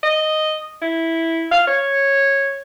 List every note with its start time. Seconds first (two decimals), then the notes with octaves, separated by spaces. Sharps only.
0.03 D#5
0.82 E4
1.51 F5
1.67 C#5